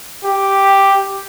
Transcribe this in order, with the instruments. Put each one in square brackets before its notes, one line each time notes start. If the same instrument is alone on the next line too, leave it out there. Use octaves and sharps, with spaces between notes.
[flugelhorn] G4